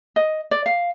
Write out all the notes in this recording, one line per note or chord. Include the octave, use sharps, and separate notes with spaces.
D#5
D5
F5